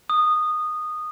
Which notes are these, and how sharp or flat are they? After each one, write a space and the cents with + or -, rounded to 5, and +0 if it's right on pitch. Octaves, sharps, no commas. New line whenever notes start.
D#6 -15